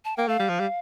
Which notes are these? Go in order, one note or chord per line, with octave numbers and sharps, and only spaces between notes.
A5
A#3 G5
A3 F5
G3
F3
G3